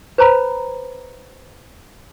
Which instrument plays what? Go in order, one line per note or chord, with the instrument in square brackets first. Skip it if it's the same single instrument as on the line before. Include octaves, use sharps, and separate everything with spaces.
[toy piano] B4 C5 A#5 B5